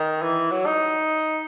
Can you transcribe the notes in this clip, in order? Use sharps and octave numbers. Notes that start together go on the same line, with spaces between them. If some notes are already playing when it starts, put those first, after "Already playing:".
Already playing: D#3
E3
F#3
D#4